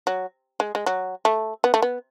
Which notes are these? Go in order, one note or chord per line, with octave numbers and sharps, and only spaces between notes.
F#3
G#3
G#3
F#3
A3
B3
A3
B3